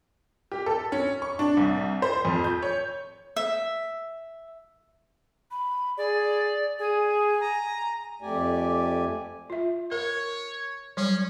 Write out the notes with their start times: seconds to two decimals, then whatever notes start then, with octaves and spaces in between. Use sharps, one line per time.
0.52 G4
0.66 A4
0.92 C#4
1.22 C#6
1.39 D4
1.57 C2
2.02 C5
2.25 F2
2.44 G6
2.62 C#5
3.36 E5
5.51 B5
5.97 G#4 D5
6.79 G#4 G#5
7.40 A#5
8.22 F2 A3 G4 D5 G#5
9.50 F4 E5
9.92 A#4 C#5
10.97 F#3 G3 C#4